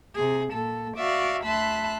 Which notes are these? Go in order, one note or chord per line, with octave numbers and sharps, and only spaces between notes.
C3 G#4
A#2 A4
F#4 D5 E5 F5
D2 E5 A5 B5 C6 F#6